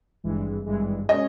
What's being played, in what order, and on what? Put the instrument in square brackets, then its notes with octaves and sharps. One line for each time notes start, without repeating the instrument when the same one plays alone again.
[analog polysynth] G#1 G2 E3 G#3
G#1 G2 E3 G#3
[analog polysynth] B2 G#3 C#4 [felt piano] D#5